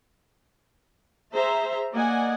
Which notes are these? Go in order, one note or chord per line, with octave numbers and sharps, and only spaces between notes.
G#4 C5 E5 A#5
A#3 D5 D#5 F#5 G#5